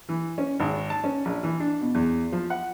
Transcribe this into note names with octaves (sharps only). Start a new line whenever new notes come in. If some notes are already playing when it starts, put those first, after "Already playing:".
E3
C#4
G#1
A5
C#4
A#1
E3
D4
B2
E2
F3
F#5